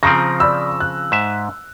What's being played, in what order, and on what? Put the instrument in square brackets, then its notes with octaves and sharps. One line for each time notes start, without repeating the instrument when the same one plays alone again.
[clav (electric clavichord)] C#3 F3 C4 [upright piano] A#5 A#6
[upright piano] D5 B5 E6
F#6
[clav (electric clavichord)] G#2 E5